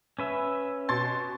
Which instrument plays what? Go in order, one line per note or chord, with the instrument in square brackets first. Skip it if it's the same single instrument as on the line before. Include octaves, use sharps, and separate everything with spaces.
[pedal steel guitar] C#4 B4 E5
[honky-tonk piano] B2 C6 A6